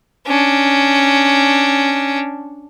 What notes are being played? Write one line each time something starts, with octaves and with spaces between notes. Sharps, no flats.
C#4 D4